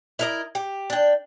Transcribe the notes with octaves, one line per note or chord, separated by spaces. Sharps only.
E4 A#4 D#5
G4
D4 G5